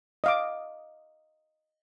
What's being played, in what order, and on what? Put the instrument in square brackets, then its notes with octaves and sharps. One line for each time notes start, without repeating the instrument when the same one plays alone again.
[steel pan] D#5 F5 D6